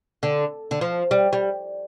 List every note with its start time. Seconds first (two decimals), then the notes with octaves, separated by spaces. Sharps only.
0.23 D3
0.71 D3
0.81 F3
1.11 G3
1.33 G3